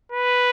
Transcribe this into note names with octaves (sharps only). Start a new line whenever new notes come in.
B4